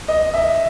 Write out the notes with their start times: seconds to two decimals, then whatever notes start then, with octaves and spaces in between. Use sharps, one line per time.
0.08 D#5
0.34 E5